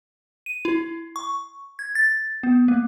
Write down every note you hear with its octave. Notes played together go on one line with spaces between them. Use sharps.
D#7
E4
C#6
G#6
A6
B3
A#3